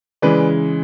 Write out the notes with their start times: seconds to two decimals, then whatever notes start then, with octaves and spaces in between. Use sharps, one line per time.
0.22 C#3 E3 G#3 B4 D5